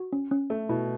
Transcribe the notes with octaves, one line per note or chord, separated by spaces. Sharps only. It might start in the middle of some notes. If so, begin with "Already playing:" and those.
Already playing: F#4
C#4
C#4
A3 A4
B2 E4